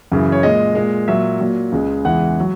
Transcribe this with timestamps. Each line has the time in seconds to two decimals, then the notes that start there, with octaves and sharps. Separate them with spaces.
0.12 F#2 C#3 E3
0.32 C#5
0.43 A#2 G#3 D#5
0.75 A#2 G#3
1.08 A#2 F#3 E5
1.40 A#2 F#3
1.72 C#2 C#3 G#3
2.04 E2 C#3 E3 G#3 F#5
2.40 F#3